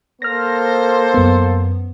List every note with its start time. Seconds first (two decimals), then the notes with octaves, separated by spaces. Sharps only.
0.22 A#3 A4 C5 F6 A#6
1.14 F#2 B3